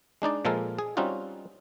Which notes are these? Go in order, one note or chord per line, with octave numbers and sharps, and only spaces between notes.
G#3 D4 D#4 D5
A#2 F3 G#3 A4 A#4
G#4
G3 C4 C#4 D#4 F4 F#4